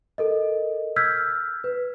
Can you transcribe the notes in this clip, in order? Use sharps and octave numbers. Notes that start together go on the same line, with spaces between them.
A4 A#4 D#5
E6 F6 G6 G#6 B6
B4